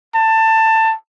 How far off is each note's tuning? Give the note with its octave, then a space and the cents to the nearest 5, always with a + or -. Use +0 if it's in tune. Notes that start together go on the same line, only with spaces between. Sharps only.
A5 +20